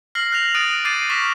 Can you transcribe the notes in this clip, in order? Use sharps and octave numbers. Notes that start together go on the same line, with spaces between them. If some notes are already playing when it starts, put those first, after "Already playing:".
F6 A#6 C7 F#7
F#6 A#6 F7
D#6 F#6 A6 D7 D#7
D6 G6 A6 C7 D7 D#7
C#6 D6 F6 A#6 B6 E7